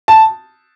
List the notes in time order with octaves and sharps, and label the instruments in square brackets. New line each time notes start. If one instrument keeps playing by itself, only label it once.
[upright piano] A5